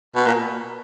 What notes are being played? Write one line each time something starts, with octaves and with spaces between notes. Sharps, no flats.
B2
A#2